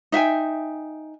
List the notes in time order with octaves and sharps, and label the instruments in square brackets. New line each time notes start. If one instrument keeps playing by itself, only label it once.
[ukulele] D#4 E5 G5 G#5